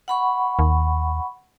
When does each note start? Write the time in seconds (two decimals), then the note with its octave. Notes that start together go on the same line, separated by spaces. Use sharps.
0.08 F#5 B5 C#6
0.59 D#2